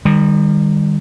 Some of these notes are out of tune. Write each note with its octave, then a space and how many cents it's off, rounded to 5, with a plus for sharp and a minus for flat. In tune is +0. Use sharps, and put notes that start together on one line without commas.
D#3 -15 G3 +30